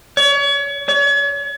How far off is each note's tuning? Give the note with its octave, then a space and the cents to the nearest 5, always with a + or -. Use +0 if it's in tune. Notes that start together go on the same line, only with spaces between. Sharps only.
C#5 +35
C#5 +40